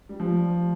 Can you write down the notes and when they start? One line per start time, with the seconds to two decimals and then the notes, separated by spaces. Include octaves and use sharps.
0.09 G3
0.20 F3